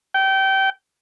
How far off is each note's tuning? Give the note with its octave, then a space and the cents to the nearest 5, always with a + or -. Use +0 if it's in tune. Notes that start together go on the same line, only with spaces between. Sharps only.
G5 -25